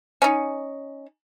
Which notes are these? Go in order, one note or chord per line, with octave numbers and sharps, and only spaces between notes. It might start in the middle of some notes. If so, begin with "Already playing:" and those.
C#4 D#4